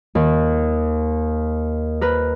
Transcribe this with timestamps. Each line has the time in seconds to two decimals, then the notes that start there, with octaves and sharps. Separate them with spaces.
0.15 D#2
2.01 A#4 B4